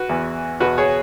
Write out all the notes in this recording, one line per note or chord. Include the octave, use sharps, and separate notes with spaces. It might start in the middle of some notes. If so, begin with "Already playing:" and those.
Already playing: F#4 B4
E2 E3
E2 B2 F#4 B4
G#4 C#5